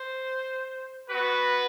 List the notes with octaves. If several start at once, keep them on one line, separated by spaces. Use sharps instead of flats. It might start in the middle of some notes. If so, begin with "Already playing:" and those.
Already playing: C5
B3 F#4 B4